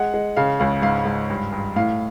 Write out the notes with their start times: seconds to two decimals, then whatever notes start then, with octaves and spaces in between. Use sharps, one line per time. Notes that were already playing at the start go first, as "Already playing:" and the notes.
Already playing: G#3 F#5
0.14 G#3
0.37 C#3 F5
0.60 C#2 F5
0.82 G#2 F5
1.06 G#2
1.30 G2
1.52 G2
1.76 A2 F5